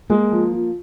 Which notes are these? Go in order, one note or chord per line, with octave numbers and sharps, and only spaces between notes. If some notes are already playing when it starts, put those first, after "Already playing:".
G#3 A#3
F3
F3